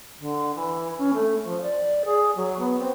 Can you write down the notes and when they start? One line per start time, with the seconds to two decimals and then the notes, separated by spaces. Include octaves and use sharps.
0.18 D3
0.55 E3
0.98 C#4
1.14 A3
1.44 F3
1.62 D5
2.05 G#4
2.36 F#3
2.59 B3
2.79 C4